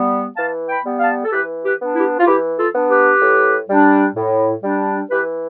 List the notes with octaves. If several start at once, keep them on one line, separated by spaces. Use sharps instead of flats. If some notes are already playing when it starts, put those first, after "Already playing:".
Already playing: G3 B3
E3 F5 A5
G5 B5
G3 B3
F5 A5
A4
E3 G4 B4
G4 B4
B3 D4
E4 G4
F4
E3 E4 G4
F4 A4
B3 D4
G4 B4
A2
G3 D4
A2
G3 D4
E3 G4 B4